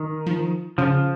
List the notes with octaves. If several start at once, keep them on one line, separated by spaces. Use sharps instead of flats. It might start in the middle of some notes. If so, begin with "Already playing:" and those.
Already playing: D#3
F3
C#3 F3